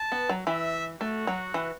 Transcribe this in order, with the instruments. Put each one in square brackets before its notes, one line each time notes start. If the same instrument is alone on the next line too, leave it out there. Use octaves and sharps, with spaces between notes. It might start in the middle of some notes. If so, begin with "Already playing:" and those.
Already playing: [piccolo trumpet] A5
[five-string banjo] B3
F#3
[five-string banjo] E3 [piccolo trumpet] E5
[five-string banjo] A3 [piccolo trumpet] F#4
[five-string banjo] F#3
E3